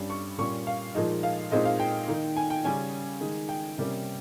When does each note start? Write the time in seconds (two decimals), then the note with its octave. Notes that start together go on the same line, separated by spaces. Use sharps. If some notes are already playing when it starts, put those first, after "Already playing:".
Already playing: G2 G3 C#4
0.10 C#6
0.38 A#2 G3 C#4 C#6
0.67 F5
0.95 A#2 F3 G#3 D#4 D#5
1.23 F5
1.51 A#2 G#3 C4 D#4 D#5
1.65 F5
1.80 G5
2.08 D#3 A#3 D#4
2.37 G#5
2.50 G5
2.64 C#3 G3 C#4 G#5
3.21 D#3 G#3 D#4
3.49 G5
3.78 C3 G3 A#3 C#4